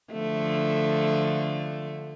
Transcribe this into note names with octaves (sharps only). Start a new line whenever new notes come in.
D3 F3 A3